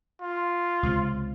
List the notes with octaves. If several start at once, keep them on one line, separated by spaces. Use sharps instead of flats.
F4
C#2 C3